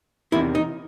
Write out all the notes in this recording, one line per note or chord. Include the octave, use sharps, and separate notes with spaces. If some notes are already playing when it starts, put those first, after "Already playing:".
E2 C3 D#3 E4
D#4